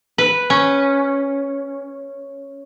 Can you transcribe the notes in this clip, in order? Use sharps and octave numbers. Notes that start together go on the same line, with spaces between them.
B4
C#4